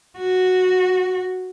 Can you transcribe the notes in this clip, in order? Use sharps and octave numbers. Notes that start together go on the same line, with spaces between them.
F#4